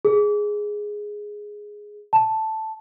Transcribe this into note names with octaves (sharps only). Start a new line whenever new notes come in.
G#4
A5